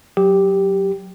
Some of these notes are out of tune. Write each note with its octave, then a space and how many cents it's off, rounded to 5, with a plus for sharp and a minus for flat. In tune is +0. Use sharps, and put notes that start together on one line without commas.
F#3 +0 G4 +0